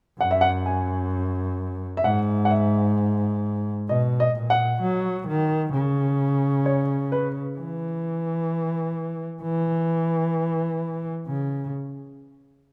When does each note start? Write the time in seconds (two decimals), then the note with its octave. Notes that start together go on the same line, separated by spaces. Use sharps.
0.20 F#2 F#5
0.31 E5
0.41 F#5
0.66 G#5
1.97 E5
2.04 G#2 F#5
2.45 F#5
2.50 E5
3.89 B2 D#5
4.20 D#5
4.35 A#2
4.50 F#5
4.82 F#3
5.27 D#3
5.73 C#3
6.66 C#5
7.12 B4
7.58 E3
9.42 E3
11.27 C#3